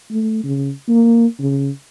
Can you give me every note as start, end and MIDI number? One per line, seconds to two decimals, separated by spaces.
0.11 0.41 57
0.44 0.71 49
0.89 1.26 58
1.40 1.70 49